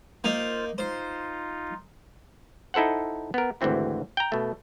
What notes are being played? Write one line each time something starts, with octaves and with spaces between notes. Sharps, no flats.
A#3 D#4 F4 C5
D#4 F4 C5
D#4 E4 A4 C5 F#5
B3 A#4
G#1 D2 D3 E3 C4 E4
G5 A#5
B2 A3